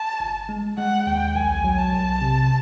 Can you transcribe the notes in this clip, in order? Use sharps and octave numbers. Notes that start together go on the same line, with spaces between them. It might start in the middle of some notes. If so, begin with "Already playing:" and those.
Already playing: A5
G1
G#3
G#3 F#5
D#2 G5
B1 G#5
F#3
A5
B1
C3